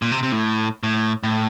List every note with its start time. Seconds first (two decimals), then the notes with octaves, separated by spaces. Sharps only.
0.02 A#2
0.12 C3
0.23 C3
0.32 A2
0.83 A2
1.23 A2